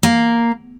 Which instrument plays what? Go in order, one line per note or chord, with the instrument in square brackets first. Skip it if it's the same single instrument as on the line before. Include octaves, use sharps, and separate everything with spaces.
[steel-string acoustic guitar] A#3